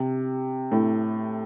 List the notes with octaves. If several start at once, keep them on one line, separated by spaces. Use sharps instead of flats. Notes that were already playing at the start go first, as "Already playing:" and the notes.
Already playing: C3
A2